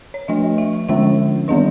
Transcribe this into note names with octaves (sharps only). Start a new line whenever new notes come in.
C#5
F3 A3 D4 D#5
E5
D3 F3 G#3 C#4 E5
D#3 G3 B3 D4 D#5